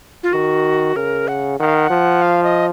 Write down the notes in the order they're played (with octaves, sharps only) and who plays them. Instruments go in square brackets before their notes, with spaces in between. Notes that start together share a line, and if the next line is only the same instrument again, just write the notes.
[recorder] F4
[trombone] D#3 [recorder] F#4
[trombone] C#3 [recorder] A#4
[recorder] F#5
[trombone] D#3 [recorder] F#5
[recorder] F5
F#5
[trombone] F3
[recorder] F5
D#5